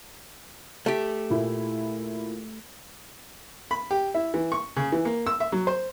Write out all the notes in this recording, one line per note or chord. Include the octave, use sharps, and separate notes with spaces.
A3 G4
A#2 E4
B5
G4
E4
E3
C#6
C#3
E3
A#3
E6
E5
F#3
C5